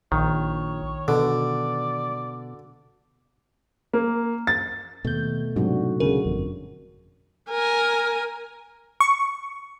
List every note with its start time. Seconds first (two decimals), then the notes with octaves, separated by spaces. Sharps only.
0.12 A#1 D#3 C#5
1.08 B2 D3 D5
3.93 A#3
4.47 A6
5.05 D#2 B2 A3 G6
5.56 G#2 C3 F#3 D4 F#4
6.00 D2 G#2 C#3 A#4
6.24 G1 F2
7.51 A#4 G#5
9.01 C#6